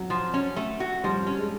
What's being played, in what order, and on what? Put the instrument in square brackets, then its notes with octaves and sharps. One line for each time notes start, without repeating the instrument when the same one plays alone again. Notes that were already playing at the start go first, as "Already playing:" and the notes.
Already playing: [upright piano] F#3
[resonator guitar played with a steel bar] F3
C#4
A3
F#4
[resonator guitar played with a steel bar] F3 [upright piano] G3
[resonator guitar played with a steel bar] C#4
[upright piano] G#3